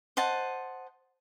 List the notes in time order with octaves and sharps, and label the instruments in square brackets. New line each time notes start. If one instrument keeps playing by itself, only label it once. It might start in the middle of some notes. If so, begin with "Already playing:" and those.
[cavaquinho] C5 D#5 F#5 A5